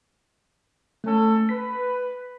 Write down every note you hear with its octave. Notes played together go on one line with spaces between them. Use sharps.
A3 C#4 A4
B4 B6